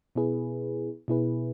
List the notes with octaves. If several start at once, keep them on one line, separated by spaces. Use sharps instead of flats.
B2 B3 E4 G#4 B4
B2 B3 E4 G#4 B4